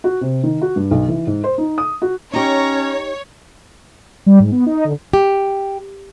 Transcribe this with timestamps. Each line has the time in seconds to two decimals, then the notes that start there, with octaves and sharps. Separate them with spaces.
0.04 F#4
0.21 C3
0.43 D#3
0.62 F#4
0.76 G2
0.91 B1
1.08 E3
1.27 G#2
1.44 C5
1.58 D#4
1.78 D#6
2.02 F#4
2.33 C#4 D#4 G4 C#5 A#5
4.26 G3
4.39 G#2
4.52 B3
4.66 D#4
4.85 D3
5.13 G4